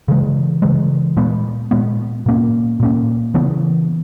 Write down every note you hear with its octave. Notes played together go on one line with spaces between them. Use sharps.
C#3 E3 G#3
C#3 E3 G#3
A#2 G#3 B3
A#2 G#3 B3
A#2 A#3 C#4
A#2 A#3 C#4
C#3 E3 B3